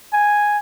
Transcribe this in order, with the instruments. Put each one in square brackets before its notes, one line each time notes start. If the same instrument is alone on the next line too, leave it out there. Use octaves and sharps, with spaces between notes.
[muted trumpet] G#5